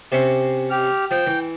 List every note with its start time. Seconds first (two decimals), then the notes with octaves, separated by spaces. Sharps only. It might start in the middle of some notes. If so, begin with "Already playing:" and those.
0.12 C3 C4 C#4
0.70 G4 F6
1.11 F3 G5
1.27 E3